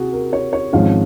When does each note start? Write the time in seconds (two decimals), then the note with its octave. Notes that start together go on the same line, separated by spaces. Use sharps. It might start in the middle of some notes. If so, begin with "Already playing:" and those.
Already playing: C3 F#4 G#4
0.13 A#4
0.33 C#5
0.53 C#5
0.73 G#1 G#2 F3 G#3 C#4 F5